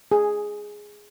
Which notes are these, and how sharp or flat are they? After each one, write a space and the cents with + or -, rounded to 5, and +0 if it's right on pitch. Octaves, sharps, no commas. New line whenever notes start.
G#4 +0